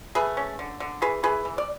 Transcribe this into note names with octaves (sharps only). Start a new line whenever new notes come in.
A3 G#4 B4
C#4
D3
D3
E3 G#4 B4
E3 G#4 B4
E3
D5